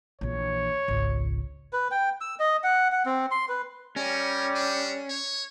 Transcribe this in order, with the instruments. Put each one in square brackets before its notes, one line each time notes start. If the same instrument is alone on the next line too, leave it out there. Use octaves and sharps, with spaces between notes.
[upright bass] A#1 E3 [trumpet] C#5
[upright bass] G#1 C#2
[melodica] B4
G5
E6
D#5
F#5
F#5
C4
C6
B4
[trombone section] G3 [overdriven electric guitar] C#4 [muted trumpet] A#4
[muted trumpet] D4
C#5